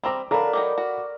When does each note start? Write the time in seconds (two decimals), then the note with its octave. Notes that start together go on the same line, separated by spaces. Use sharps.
0.04 G3 C4 A#5 B5 D6
0.31 F#3 D4 A4 A#4 D5 F5 A#5 B5
0.53 D#3 F#3 D#4 D6
0.78 F#4